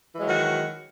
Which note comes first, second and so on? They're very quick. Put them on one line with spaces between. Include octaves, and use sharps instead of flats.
E3 G#3 F#3 D#3 F#4